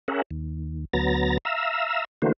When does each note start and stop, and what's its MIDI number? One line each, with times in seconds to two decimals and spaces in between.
0.08 0.22 61
0.08 0.22 68
0.08 0.22 70
0.08 0.22 76
0.08 0.22 78
0.31 0.85 39
0.93 1.38 38
0.93 1.38 54
0.93 1.38 59
0.93 1.38 82
0.93 1.38 93
0.93 1.38 94
1.45 2.04 76
1.45 2.04 77
1.45 2.04 82
1.45 2.04 88
2.22 2.32 50
2.22 2.32 52
2.22 2.32 57
2.22 2.32 58
2.22 2.32 66
2.22 2.32 72